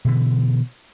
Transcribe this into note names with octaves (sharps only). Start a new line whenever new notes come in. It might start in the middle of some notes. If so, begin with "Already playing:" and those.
B2 D3 E3